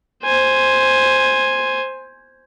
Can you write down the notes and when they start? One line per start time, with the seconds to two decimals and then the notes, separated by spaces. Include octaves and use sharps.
0.24 C5 G#5